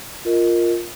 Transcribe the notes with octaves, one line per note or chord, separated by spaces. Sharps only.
F4 A#4 D#5